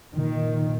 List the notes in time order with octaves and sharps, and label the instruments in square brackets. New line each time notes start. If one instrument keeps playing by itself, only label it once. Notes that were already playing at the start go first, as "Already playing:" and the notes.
[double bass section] A#2 D#3